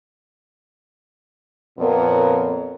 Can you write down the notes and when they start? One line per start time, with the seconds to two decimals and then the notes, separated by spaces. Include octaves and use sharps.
1.78 F2 A#2 B3 A#4 C#5